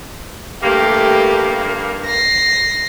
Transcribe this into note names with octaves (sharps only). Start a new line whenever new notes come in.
G2 A3 A#3 G4
A#6 C7